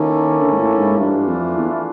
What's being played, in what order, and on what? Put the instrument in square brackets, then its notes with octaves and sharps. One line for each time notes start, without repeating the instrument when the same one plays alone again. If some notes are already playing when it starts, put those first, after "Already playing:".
Already playing: [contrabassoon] D#3 [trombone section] A#3 C#4 E4 A4
[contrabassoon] D3
G#2
A2
G#2
[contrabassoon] G2 [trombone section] E3 A3 D4 F4
[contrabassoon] F2
E2